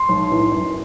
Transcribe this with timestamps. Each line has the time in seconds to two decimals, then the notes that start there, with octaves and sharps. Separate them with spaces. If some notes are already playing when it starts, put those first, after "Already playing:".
Already playing: C6
0.09 B1
0.30 A2 E3
0.52 F#2